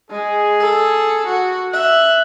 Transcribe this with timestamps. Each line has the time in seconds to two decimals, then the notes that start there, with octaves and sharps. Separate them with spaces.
0.11 G#3 G#4
0.60 A4
1.27 F#4
1.73 E5 F#6